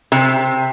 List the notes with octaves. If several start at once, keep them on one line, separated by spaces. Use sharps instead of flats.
C3